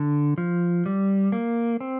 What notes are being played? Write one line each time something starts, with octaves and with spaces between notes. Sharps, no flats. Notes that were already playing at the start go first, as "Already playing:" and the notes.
Already playing: D3
F3
G3
A#3
C4